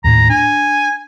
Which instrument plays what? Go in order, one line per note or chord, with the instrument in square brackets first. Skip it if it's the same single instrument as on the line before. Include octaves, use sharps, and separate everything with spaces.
[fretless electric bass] D#2 A2 [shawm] A#5
[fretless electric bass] D4 [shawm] G#5